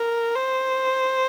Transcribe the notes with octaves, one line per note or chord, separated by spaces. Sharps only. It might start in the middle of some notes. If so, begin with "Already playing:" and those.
Already playing: A#4
C5